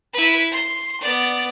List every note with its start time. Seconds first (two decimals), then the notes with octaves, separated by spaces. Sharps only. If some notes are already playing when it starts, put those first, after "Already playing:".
0.13 E4 B4
0.51 C6
1.02 B3 D5